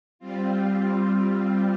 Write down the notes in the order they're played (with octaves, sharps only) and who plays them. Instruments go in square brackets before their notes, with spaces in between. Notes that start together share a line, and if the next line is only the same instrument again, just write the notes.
[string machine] G3 C4 F4